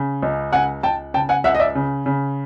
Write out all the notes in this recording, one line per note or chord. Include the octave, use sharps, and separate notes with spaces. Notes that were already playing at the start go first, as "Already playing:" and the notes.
Already playing: C#3
C#2
C#2 F#5 G#5
C#2 G5 A5
C#3 G5 A5
F#5 G#5
C#2 E5 F#5
D#5
D5 E5
C#3
C#3